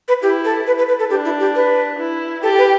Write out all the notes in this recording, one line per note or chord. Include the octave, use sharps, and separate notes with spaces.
B4
E4 G4
A4
B4
B4
B4
A4
D4 G4
E4
G4
B4
E4
G4 A4
B4